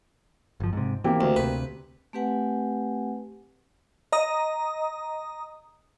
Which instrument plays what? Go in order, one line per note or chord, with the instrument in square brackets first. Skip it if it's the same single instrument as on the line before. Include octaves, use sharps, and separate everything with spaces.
[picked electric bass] G1 F3
G#2 C3
[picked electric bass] E3 [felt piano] A#3 C4 G4
[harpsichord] D2
[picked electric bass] D2 C3 [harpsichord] B4
[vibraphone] A3 C4 G4 B4 F#5 G#5
[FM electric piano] D#5 A#5 D#6